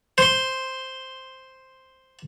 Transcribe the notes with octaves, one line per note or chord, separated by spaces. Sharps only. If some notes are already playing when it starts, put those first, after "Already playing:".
C5 C6